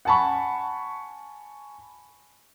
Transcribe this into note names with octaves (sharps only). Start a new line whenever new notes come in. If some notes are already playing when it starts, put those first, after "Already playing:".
F#5 G#5 A5 B5 C#6